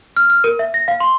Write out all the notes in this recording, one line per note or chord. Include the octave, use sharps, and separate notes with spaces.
F6
F6
A#4
E5
A#6
F5
C6